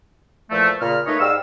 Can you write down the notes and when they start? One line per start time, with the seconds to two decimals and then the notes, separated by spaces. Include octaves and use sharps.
0.51 A#2 E3 F3 A3
0.81 A#2 C#3 F6
1.07 A3 A#3 D#4 B4 C#5 D#5
1.20 G#2 G3 D#4 F5 E6